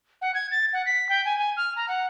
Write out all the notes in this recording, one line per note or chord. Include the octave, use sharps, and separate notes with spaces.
F#5
G#6
A6
F#5
B6
G5
G#5
G#5
F6
A#5
F#5